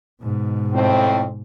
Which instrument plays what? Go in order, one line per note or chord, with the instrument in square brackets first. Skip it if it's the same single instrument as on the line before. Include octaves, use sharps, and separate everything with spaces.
[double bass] G#2 B2
[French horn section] F2 A2 C4